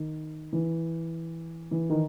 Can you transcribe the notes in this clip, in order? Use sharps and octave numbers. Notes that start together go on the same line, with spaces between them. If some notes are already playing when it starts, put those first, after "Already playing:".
Already playing: D#3
E3
E3
D#3